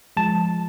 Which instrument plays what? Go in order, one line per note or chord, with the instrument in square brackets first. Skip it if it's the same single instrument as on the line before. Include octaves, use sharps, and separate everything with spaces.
[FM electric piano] F3 G#3 A5